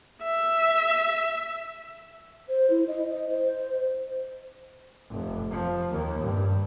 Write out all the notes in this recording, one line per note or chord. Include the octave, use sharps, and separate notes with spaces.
E5
C5
E4
D#5
D#5
C5
F1
F3
D#2
G2